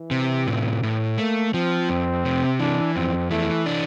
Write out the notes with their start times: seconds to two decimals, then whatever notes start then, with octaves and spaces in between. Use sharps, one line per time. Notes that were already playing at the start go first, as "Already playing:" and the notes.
Already playing: E3
0.11 C3
0.47 A2
0.83 A2
1.18 A3 A#3
1.54 F3 C4
1.89 F2
2.25 C3
2.60 E3 D4
2.95 F2 C4
3.31 E3 A3
3.66 D4